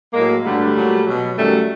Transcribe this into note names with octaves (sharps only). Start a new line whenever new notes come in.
A2 F#3 G#3 A#3
G2 D3 F#3 G3 A3
A#2 F#3
B2 F#3
F#2 D#3 F#3 G3 A3